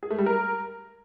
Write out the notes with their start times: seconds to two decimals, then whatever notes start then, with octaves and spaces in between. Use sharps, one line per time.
0.03 G#4
0.11 A3
0.18 G3
0.26 A#4